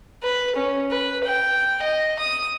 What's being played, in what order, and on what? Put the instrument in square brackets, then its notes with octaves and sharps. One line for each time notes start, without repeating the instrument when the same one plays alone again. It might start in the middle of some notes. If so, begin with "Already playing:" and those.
[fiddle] B4
C#4
B4
G5
D#5
D#6